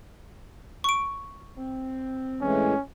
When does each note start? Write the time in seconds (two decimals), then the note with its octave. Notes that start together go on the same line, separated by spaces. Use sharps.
0.84 C#6 D7
1.57 C4
2.41 A2 E3 G#3 C#4